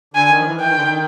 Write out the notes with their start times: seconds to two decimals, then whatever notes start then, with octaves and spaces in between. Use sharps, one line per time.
0.14 D3 G#5
0.30 D#3
0.40 F3
0.45 E3
0.60 E3 G5
0.68 D#3
0.76 D3
0.83 D#3